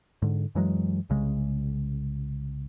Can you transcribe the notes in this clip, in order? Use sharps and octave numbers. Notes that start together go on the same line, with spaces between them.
G#2 D3
F#2 E3 F#3 G#3
C2 C#3 G#3